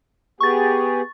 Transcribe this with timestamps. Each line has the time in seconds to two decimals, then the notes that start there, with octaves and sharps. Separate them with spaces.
0.40 B3 G4 G#4 C#6 A6